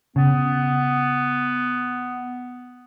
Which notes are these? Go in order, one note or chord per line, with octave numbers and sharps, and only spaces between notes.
C#3 B3